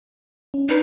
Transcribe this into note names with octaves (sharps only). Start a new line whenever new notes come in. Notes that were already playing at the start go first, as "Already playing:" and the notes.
C#4
D4 D#4 B4